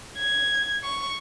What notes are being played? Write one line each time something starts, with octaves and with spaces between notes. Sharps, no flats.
G#6
C#6